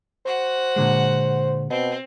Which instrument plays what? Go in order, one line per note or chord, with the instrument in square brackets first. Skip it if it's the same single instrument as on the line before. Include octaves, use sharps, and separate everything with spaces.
[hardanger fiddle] F#4 F#5 [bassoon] C5
[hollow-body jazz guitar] A#2 D3 G#3
[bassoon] B2 [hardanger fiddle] C4